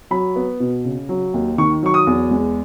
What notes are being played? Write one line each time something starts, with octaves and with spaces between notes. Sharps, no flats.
F#3 B5
B3
B2
C#3
F#3
D#2
D#3 C#6
F#3 C#6
D#6
E2
G#3